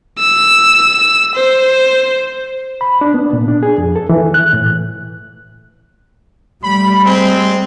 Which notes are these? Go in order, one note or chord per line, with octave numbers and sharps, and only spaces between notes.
E6
C5
B5
D4
B3
A#2
D4
G#4
F2
A4
E3
F#6
A2
G3 A3 B5
G#3 C4